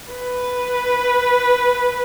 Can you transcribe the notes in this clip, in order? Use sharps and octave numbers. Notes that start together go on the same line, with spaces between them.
B4